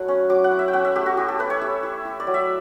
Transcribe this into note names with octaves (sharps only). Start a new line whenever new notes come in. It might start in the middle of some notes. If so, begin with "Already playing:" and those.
Already playing: F#3 A3 E4 F#5
C#4
F#3 D6
F#5
E4
E5
G5
C#4 F#5
E5
A3 G4
F#4
E4 G4
A4
E4 B4
C#5
E4 E5
E4
E4
D5
F#3
E5